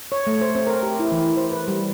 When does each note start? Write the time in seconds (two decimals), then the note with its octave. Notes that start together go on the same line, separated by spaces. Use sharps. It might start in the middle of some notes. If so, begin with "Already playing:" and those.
0.12 C#5
0.27 A3
0.41 C5
0.55 C4
0.67 A#4
0.83 G4
1.00 E4
1.12 E3
1.37 C5
1.52 B4
1.68 G3